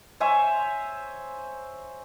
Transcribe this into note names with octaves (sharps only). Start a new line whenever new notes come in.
C5 C#5 E5 G#5